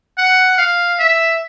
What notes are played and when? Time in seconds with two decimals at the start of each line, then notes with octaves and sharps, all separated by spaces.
0.18 F#5
0.58 F5
0.99 E5